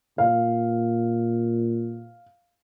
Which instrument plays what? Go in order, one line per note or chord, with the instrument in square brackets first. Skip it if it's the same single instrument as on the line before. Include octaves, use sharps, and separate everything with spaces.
[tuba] A#2 [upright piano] F5